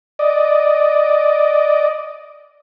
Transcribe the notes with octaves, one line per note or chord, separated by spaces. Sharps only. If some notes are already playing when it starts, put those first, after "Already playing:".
D5 D#5